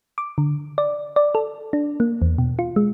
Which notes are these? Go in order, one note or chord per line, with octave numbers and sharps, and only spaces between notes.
D6
D3
D5
D5
A4
D4
A#3
E2
B2
F4
G#3